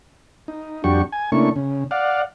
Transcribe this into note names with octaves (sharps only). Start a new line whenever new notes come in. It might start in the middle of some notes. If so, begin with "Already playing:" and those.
D#4
F2 G3 D4 F#4 G4 C#6
G#5
C#3 A3 A#3 D4 E4 C#6
C#3
D5 F5 F#5